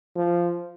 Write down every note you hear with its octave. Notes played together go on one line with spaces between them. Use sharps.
F3